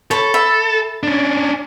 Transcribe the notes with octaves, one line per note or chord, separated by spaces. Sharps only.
A4 C#5 A5 B5
E5 B5
C#4 D4